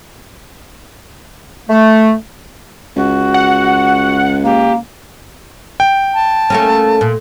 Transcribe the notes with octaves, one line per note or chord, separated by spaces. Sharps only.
A3
C#2 F#4
F#5
A#3 G4
G5
A5
A3 A#3 C#4
A#2